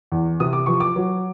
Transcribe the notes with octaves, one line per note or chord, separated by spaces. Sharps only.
E2
C3 D#6
D6
F3 C#6
D6
F#3